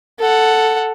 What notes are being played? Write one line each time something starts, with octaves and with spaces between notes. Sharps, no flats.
A4 F#5